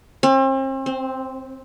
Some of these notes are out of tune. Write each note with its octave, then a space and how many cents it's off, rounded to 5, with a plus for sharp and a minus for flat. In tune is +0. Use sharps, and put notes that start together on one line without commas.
C4 +40
C4 +0